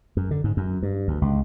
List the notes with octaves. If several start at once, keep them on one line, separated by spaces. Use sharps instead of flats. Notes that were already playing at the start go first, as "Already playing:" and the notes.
F#2
D3
G#2
F#2
G2
D2
C#2